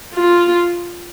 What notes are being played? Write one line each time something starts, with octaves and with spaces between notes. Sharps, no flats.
F4